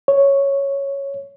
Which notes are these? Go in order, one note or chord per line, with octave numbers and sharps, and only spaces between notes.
C#5